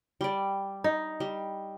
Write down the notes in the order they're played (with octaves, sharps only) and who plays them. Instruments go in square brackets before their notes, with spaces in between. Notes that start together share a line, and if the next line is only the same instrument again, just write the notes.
[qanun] G3 D5
[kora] D#4
[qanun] G3